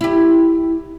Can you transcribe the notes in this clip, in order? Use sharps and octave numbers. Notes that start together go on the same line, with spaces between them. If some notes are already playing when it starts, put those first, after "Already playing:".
E4 G4